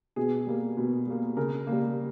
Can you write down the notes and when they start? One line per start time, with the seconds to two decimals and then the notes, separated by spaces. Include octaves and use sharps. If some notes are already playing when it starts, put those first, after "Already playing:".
0.16 B2 G#4
0.47 G3 A#3
0.77 B2
1.07 G3 A#3
1.37 C#3 A#4
1.67 G3 A#3